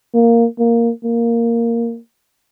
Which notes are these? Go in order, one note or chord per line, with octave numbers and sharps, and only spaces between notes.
A#3
A#3
A#3